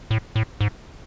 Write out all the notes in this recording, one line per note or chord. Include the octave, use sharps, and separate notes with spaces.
A2
A2
G#2